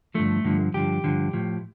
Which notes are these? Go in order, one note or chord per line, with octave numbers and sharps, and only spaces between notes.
G2 D3 F3 A3
G2 D3 F3
G2 D3 F3 G4
G2 D3 F3
A2 F3